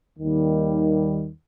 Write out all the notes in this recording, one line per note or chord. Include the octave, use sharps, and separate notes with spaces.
D#2 D#3 G3